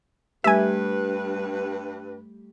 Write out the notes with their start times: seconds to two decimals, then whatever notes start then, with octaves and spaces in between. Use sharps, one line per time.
0.44 G2 G3 A3 G4 B4 E5 G#5